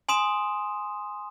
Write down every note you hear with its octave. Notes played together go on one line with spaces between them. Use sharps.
G#5 C6 D#6 E7